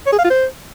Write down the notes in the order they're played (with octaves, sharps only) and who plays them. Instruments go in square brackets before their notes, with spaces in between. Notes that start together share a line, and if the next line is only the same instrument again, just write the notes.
[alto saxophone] C#5
G#4
F5
F4
C5